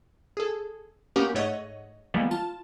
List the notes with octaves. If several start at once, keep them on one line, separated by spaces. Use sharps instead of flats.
G#4 A4
A#3 B3 C#4 F#4 G4 A#4
G#2 A3 C#5 D#5 F#5
E3 F3 G3 G#3 A#3 B3
F4 A5